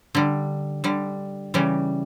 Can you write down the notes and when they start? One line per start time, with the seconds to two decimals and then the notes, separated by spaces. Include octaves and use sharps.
0.15 D3 G3
0.84 D3 G3
1.54 C#3 E3 G3